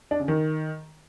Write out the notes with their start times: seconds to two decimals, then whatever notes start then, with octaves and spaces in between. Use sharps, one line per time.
0.11 D4
0.20 C#3
0.28 D#3